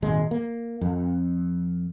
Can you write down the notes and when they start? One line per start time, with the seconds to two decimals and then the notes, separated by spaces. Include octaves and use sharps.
0.02 D#1 G#1 G#3
0.31 A#3
0.81 F2